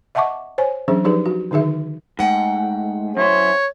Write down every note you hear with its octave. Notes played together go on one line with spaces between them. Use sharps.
D#5 E5 F#5 A5 C#6 D6
C5 C#5 G#5
E3 F#3 C#4 D4 G#4 C5
F3 D#4 G4 G#4 B4
F#4
D3 D#3 D#4 G#4 E5
G#2 A3 F#5 G5
F#2 E4 C5 C#5